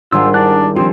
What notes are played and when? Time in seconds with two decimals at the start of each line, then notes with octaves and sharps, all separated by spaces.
0.12 G#1 G3 G#3 D4 F4 C5 F#5 E6
0.34 D4 E4 A#4 D5 F#6
0.76 F3 C4 D4 F4 G4 G#4